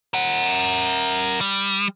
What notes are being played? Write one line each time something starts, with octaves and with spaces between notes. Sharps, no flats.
A#4 F#5
G3